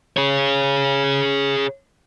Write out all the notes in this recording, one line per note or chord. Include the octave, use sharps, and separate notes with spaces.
G#4 C#5